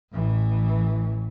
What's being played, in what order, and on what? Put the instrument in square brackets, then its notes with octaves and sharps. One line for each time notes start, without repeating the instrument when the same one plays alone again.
[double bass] A1 E3